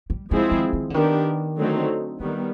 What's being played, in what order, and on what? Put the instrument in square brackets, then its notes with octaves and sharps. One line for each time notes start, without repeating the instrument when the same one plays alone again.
[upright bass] G3
[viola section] F3 G#3 C4 E4 G#4 [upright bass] G3
[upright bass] D#3
D#3
D3
[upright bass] D#3 [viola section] B3 D4 G4 A#4
[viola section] D3 F#3 A3 C4 D#4
[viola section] D#3 G3 B3 [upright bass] G#3